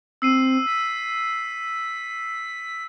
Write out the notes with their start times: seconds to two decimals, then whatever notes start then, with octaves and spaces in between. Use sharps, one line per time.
0.22 C4 E6 C7 D#7
0.66 B6